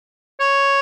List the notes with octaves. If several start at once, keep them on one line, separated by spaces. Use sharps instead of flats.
C#5